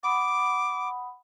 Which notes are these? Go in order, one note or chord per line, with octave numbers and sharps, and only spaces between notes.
F#5 B5 D6 D#6